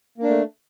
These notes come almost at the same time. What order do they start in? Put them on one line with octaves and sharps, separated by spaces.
A#3 D4 A3